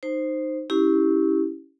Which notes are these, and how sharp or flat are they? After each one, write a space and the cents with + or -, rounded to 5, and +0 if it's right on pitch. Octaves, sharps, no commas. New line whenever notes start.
D#4 -15 C5 +0
C#4 +0 E4 -20 G4 +0